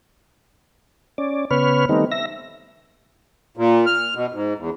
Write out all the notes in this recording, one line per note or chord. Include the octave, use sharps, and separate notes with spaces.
C#4 D5
C#3 B3 B4 C#5 F6
D#3 G3 A3 B3 C4 D#4
E5 A#6
A#2
F6
B2
G#2
E2